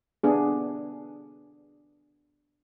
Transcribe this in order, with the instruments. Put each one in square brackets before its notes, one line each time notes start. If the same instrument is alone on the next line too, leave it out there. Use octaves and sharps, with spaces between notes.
[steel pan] B3 D4 G#4